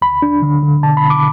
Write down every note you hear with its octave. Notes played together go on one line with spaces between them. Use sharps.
D2 B5
D4
D3
D3
B2 A5
B5
B2
D6